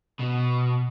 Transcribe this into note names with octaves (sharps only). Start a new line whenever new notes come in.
B2